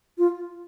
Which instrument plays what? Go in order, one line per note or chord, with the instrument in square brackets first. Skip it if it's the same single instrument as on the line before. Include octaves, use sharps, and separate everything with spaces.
[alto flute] F4